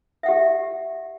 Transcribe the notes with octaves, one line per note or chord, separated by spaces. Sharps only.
G4 E5 F#5